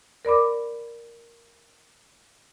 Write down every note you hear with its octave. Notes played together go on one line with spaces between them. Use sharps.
A#4 D5 B5 D6